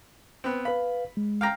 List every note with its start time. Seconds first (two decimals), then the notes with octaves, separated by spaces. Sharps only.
0.44 B3 C4
0.65 B4 F5 B5
1.17 G#3
1.41 F5 G5 A#5